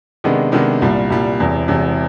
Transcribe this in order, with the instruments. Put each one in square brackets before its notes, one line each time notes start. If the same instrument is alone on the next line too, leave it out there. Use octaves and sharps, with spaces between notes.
[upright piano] C3 D#3 G#3 B3 D4
C3 D#3 G#3 B3 D4
C2 A#2 G3
C2 A#2 G3
E1 E2 C3
E1 E2 C3